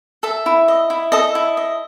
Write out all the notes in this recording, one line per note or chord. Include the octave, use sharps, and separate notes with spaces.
A4 E5
E4
D#5
E4
A4 D#5
E4
D#5